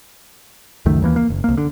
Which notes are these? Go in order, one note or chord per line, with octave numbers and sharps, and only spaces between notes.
C#2 F#2 D#3 A3
D#2 E3 A#3
A#3
F#1
C2 A#3
D3